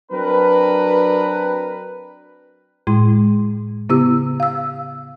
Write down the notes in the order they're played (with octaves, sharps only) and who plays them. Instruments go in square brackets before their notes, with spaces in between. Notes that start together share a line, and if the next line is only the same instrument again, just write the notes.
[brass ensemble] F#3 C4 D4 A#4 B4
[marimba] A2 G#3 E4 C6
C#3 B3 E4 G4 E6
F5 E6